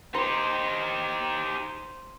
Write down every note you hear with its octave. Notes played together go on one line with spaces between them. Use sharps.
D#4 G4 C5